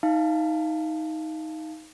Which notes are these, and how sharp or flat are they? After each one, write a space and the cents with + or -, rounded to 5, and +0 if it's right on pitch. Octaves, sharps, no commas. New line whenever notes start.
D#4 +15 F5 -10 A5 -20